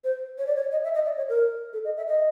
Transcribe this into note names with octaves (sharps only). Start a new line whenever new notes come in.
C5
C#5
D5
C#5
D#5
E5
D#5
D5
C#5
A#4
A4
D#5
E5
D#5